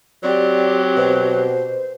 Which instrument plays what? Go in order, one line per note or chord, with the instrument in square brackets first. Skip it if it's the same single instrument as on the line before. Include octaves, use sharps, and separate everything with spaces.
[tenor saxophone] F#3 [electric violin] C4 G4 [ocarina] D5
[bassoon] B2 [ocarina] C5